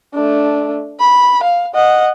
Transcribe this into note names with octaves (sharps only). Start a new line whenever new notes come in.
A3 D4
B5
F5
D#5 F#5